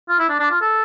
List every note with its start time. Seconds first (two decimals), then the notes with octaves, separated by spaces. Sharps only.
0.09 F4
0.19 E4
0.29 D4
0.40 D4
0.51 F4
0.61 A4